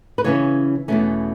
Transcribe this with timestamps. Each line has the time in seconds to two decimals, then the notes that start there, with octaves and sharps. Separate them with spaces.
0.18 B4
0.24 C#3 E3 C#4 C#5
0.88 E2 B2 A3 C#4